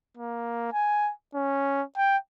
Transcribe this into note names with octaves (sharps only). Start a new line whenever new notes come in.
A#3
G#5
C#4
G5